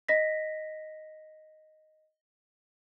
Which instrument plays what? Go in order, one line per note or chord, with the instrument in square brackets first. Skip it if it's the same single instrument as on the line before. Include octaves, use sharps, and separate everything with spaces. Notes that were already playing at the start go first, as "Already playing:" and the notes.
[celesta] D#5 A#6 B6